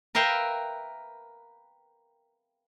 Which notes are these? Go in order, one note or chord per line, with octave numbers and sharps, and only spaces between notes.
A#4 B4 E5 F5 G5